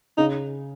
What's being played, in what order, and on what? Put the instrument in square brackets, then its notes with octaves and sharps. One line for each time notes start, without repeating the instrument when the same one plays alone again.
[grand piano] C#3 [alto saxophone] D#4